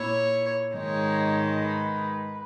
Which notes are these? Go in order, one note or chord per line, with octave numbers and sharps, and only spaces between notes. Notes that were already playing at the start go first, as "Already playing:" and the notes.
Already playing: A#2 A#3 E4 C#5
G#2 D#3 G#3 D#4 C#5
B4